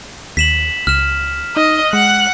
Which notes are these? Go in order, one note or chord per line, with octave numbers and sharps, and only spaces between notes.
D#2 B6 E7 F#7
C#2 F6 E7
D#4 D#5
G#3 F#5 F#6